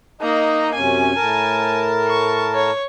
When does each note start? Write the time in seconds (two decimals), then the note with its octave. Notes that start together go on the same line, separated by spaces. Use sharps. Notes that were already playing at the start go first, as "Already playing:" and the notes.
0.21 A#3 D#4 D#5 A#5
0.75 F#2 C3 C#4 G#5
1.15 A2 A#4 A5
2.08 C#6
2.54 C#5